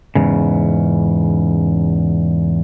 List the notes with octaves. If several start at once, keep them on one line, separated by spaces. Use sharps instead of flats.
E2 G#2 C#3